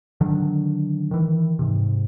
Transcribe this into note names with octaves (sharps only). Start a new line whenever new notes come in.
D3 D#3 F#3 D4
D#3 E3
G#2 C3